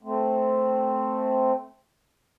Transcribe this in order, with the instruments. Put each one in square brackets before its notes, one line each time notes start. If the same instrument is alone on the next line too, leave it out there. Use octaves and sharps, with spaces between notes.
[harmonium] A3 C4